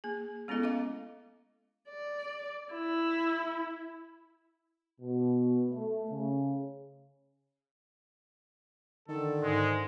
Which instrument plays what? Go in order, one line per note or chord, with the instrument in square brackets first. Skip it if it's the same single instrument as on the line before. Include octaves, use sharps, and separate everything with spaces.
[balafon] A#3 G#4
G#3 B3 C#4 E4 A4 D#5
D#5 F5 D6
[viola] D5
E4
[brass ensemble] B2
A3
C#3
[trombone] D3 [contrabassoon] D#3 [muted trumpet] A4
[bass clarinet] G#2 [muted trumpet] G#3